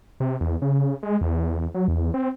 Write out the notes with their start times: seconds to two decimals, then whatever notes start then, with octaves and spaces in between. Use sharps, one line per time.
0.20 C3
0.41 E2
0.62 C#3
1.03 G#3
1.21 E2
1.75 F#3
1.88 E2
2.14 C4